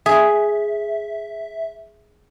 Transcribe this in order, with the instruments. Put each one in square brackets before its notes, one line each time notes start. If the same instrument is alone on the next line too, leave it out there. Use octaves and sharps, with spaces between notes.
[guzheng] G#4 [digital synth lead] E5